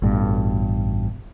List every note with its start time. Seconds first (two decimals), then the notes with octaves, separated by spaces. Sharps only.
0.02 A1 G2 B2